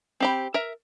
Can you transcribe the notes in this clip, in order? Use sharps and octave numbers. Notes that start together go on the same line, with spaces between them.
C4 G4 B5
A#4 E5